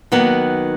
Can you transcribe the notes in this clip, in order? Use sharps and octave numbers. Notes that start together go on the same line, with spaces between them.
D#3 F#3 A#3 B3